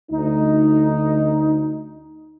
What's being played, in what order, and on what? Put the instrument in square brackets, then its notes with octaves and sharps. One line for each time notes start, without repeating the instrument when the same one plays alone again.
[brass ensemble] D2 D#4